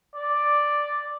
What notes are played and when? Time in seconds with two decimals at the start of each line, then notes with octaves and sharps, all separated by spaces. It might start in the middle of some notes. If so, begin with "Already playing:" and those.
0.14 D5